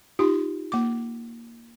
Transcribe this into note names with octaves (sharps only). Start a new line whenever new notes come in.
D#4 F4 G4
A#3 D6